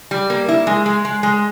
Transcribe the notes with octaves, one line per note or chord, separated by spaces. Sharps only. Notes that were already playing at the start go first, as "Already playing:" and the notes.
G3
A#3
E4
G#3
G#3
G#3
G#3